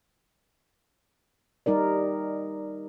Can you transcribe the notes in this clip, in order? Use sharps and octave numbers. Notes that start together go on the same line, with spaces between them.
G3 D#4 A#4 D5